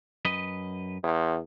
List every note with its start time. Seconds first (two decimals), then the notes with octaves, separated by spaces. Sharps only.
0.25 F#2 B4 D#5
1.03 E2